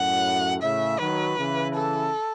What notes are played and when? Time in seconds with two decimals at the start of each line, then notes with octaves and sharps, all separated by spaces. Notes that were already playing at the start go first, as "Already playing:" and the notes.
Already playing: F#2 A2 F#5
0.61 A2 C#3 E5
0.98 D#3 F#3 B4
1.37 C#3 E3
1.75 A4